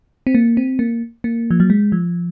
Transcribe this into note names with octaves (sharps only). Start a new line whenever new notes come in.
C4
A#3
C4
A#3
A#3
F3
F#3
G#3
F3